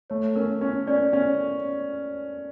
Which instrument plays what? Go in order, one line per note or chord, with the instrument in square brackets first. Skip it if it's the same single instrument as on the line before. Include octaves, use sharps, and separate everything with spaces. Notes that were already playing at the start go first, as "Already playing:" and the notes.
[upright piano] A3 [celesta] C#5
[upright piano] C#4 [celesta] A#4
[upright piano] C#4 [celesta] A#4
[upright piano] C#4 [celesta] D5
[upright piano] C#4